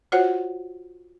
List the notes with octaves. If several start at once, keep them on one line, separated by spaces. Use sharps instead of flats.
F4 F#4 C5 C#5 F#5